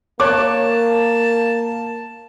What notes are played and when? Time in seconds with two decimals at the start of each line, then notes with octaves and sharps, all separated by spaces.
0.20 A#3 C#5 A5 D6 F#6